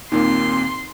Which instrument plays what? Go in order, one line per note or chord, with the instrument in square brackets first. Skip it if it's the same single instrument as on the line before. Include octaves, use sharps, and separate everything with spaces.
[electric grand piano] D#2 A#2 A#3 [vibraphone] C4 [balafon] D#4 [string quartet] C6